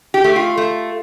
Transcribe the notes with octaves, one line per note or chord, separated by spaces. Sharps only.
G4
A3
F4
A3